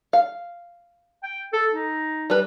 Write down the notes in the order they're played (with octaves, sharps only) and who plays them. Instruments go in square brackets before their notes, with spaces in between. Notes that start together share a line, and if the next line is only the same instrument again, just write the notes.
[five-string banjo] F5
[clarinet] G5
A4
D#4
[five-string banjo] G3 B4